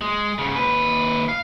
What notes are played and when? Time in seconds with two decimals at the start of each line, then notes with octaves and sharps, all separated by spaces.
0.01 G#3
0.38 G#2 C#3
0.55 D#2 B4
1.29 F5